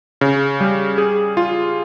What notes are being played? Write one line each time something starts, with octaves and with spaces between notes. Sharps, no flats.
C#3
G3
G#4
F4